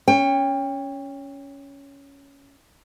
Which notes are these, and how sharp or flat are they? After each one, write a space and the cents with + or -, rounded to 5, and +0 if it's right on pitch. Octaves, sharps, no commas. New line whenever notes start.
C#4 +10 G5 +30